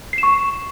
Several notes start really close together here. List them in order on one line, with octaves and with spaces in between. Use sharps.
C7 E7 C#6